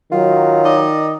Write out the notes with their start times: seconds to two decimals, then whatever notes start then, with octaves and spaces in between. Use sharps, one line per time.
0.12 D#3 F#3 F4
0.65 D#4 D5 D#5